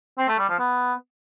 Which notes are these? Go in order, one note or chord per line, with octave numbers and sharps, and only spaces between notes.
C4
A3
G3
F3
B3